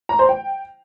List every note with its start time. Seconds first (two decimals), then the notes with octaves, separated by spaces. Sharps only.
0.09 A#5
0.19 C5
0.29 G5